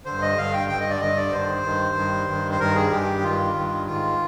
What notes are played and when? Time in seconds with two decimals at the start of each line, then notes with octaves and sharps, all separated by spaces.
0.05 G2 D3 C5
0.22 D#5
0.38 G2 D3 F5
0.53 G5
0.69 G2 D3 G5
0.80 D#5
0.90 D5
1.00 G2 D3 D#5
1.17 D5
1.32 G2 D#3 C5
1.64 G2 D#3
1.96 G2 D#3
2.28 G2 D#3
2.51 C5
2.60 G2 D#3 A#4
2.76 G#4
2.91 G2 D#3 G4
3.23 G2 D#3 F4
3.55 G2 D#3
3.86 G#2 D#3 F4